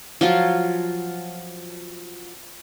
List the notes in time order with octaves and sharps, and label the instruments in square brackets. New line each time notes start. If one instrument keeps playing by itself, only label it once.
[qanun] F3 F#3 F4